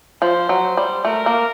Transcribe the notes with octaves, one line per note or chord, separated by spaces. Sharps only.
F3 C5
F#3
G3
A3 A#4
A#3